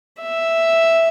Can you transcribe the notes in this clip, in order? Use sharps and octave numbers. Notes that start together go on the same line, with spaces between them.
E5